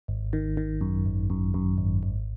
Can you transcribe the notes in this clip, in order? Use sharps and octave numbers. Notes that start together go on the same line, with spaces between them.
G#1
D#3
D#3
F#2
G#1
F#2
F#2
G#1
G#1